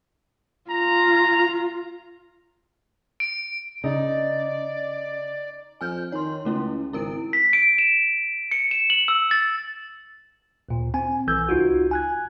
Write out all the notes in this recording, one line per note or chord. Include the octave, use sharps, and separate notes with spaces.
F4 A#5
D7
C#3 D#4 D5
F2 G#5 F6 G6
D#3 C#5 C6
C#2 A3 C#4 E4
G#1 E4 A#4 D7
B6
D7
E7
C#7
E7
F#7
E6
A6
D2 A#2
C4 G#5
B1 E3 E6 G6 G#6
C#2 D#4 F4 F#4
G#5 F#6 G#6